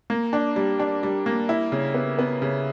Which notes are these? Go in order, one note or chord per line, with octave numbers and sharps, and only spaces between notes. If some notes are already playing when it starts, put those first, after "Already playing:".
A#3
D4
G3
D4
G3
A#3
E4
C#3
B3
B3
C#3